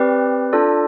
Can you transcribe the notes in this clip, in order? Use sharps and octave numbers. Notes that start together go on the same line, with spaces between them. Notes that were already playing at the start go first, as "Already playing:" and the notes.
Already playing: C4 G4 B4 D5
D4 F4 A4 D5